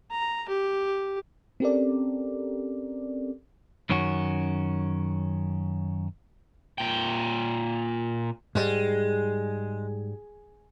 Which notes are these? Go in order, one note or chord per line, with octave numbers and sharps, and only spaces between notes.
A#5
G4
C4 C#4 G4 A4 A#4 D5
F#2 D#3 C#4 F#4
A#2 G5
G#2 G3 G#3